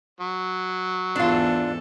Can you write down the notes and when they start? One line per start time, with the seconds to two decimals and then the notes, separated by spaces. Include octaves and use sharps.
0.21 F#3
1.16 E2 G#2 D4 F4 A4